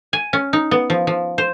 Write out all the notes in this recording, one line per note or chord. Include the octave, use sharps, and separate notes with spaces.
G#5
C#4
D#4
B3
F3
F3
C5